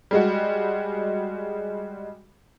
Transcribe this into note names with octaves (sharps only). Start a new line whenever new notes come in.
G3 G#3 F#4